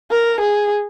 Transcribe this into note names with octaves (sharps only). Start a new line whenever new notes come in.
A#4
G#4